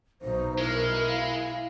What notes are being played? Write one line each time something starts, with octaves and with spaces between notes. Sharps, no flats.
B1 D#4 C5
G#3 E4 A#4
F5